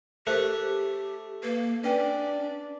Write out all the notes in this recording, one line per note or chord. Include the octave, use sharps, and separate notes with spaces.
A3 G4 A#4 C5 F#6
A#3 B4
C#4 D4 B4 D5 G5